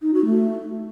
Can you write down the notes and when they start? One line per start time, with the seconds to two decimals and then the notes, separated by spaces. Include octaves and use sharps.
0.02 D#4
0.14 F#4
0.26 A3